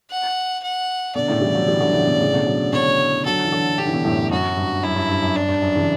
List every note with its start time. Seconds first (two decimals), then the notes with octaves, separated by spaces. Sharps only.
0.10 F#5
0.63 F#5
1.15 B2 D3 D5
1.28 A2 C#3
1.41 E3 G3
1.55 D3 F#3
1.68 E3 G3
1.80 D3 F#3
1.94 C#3 E3
2.07 B2 D3
2.21 A2 C#3
2.33 B2 D3
2.46 D3 F#3
2.73 B2 D3 C#5
3.25 D3 F#3 A4
3.45 E3
3.52 D3 F#3
3.78 D3 G4
3.87 E3
3.94 B2 D3
4.04 F#2 A2
4.31 F#2 F#4
4.57 G2
4.83 F#2 E4
4.96 G2
5.09 G2
5.23 F#2
5.36 G2 D4
5.49 G2
5.62 F#2
5.75 C#3 E3